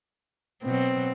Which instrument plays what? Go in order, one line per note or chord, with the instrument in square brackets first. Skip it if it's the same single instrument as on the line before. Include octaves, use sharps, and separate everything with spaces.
[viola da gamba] B2 F#3 [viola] C4